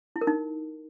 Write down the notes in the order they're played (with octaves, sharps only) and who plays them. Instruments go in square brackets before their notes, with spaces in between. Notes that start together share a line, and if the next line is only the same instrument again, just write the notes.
[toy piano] E4
A#4
D#4